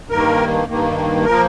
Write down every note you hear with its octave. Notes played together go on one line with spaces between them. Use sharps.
G2 D#3 A#3 A#4
G2 D#3 A#3
F3 A#3 A#4